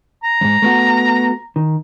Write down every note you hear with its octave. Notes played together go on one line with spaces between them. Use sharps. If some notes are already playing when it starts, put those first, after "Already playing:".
A#5
F2 G#2
A3 B3 F#4
D#3